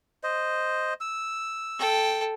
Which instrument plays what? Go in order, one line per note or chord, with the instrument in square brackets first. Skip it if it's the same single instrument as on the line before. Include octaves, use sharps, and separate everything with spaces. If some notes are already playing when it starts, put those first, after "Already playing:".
[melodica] C5 D#5
E6
[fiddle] A4 G5